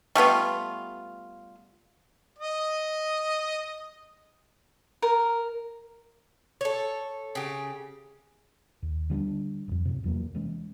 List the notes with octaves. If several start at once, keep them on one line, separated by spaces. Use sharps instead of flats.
G3 A3 B3 F4
D#5 D#6
A#4
A4 C#5
C#3 G4
D#2
D3 G3 C#4 D4
D#1 F2
F#2 C3
E2 F#3 A#3
C3 E3 G#3 C#4